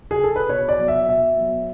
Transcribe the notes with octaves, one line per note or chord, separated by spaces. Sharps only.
G#4
A4
B4
B2 C#5
D5
F#3 B3
E5
B2 E5
F#3 B3